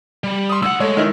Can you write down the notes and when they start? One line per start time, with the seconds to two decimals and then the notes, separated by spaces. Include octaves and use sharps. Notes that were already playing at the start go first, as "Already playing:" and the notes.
0.24 G3
0.49 C6 D#6
0.62 D2 F#5 E6
0.80 G#3 A3 C#5
0.97 D#3 D#4 E4